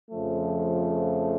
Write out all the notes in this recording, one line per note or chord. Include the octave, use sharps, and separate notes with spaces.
F2 C#3 F3 A3